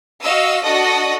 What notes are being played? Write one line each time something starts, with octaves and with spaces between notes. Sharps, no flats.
F#4 D#5 F5 E6
D4 F#4 A4 D#5 D#6 A#6